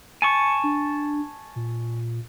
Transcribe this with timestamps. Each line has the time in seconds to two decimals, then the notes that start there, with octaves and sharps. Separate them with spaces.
0.22 G#5 A5 C#6 C#7
0.64 D4
1.56 A#2